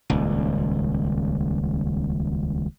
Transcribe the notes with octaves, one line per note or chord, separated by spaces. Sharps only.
D#1 C#2